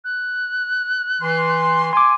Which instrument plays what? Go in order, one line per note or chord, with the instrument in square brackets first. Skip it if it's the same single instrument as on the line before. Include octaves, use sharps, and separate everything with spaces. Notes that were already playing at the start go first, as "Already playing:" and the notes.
[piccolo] F#6
[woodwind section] E3 C6
[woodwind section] G#5 [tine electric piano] C6 D6